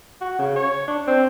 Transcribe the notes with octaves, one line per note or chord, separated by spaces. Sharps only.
F#4
C#3
C#5
D4
C4